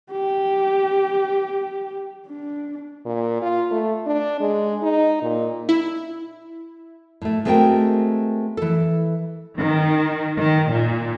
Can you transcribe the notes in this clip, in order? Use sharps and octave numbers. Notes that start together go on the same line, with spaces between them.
G4
D4
A#2
F4
A3
D4
G#3
D#4
A#2
E4
A2 A3
G#3 A3 C4 F#4 A#4 G5
E3 A4
D#3
D#3
A#2